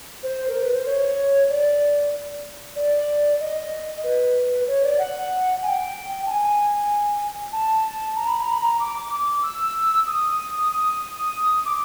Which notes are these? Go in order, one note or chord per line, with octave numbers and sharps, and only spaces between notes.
C5
A#4
B4
C5
C#5
D5
D5
D#5
B4
C#5
D5
F#5
G#5
G5
A5
G#5
A5
A#5
B5
A#5
B5
A#5
D6
E6
D#6
D#6
D6